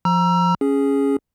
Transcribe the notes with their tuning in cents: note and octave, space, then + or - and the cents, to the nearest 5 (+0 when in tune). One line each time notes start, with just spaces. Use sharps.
F3 +0 A#5 +20 E6 +25
C#4 +0 G#4 +0